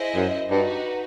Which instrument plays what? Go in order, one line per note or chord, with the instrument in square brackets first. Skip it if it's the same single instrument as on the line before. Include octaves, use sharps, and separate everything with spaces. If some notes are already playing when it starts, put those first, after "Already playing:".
Already playing: [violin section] E4 G#4 C5 D#5
[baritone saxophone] F#2
[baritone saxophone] G2 [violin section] D#4 F#4 B4